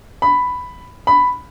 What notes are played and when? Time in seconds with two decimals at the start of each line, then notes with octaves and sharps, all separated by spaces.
0.22 B5
1.07 B5